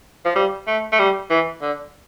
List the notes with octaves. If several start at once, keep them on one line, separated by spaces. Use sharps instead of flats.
F3
G3
A3
A3
G3
E3
D3